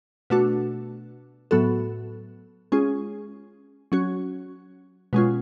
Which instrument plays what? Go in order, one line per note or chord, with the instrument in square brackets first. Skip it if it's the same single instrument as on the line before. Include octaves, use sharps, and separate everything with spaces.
[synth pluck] B2 A3 D4 F#4
A2 F#3 B3 F#4 A4
G#3 C#4 F4 G#4
F#3 C#4 F#4
B2 G#3 C#4 F4